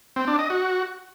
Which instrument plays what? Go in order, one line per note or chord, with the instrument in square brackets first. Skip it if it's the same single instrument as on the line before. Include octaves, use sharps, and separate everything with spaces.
[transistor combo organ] C4
D4
D#5
F#4